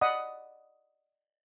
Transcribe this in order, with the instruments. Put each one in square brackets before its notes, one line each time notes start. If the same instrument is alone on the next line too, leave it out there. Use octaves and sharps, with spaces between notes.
[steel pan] D5 D#5 F#5 B5 D#6